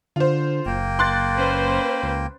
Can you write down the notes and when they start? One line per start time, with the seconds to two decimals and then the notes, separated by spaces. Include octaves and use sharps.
0.16 D3 F4 C5
0.66 F#1 A#3 G5
0.99 C6 F#6 A6
1.35 C#4 B4 C5
2.03 C#2